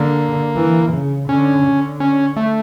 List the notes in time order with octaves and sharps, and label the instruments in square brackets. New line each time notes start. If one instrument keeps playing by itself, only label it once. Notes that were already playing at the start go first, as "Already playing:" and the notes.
Already playing: [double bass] D3 [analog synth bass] A#3
[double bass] E3
C#3
[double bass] D3 [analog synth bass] C#4
[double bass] D3
[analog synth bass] C#4
A3